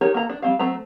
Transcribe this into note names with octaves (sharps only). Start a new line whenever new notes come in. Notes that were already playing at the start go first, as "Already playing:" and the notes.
D#4 G4 A#4 C#5
A#3 A4 A#5
D4
G3 C4 F5
F#3 A3 C4 A#5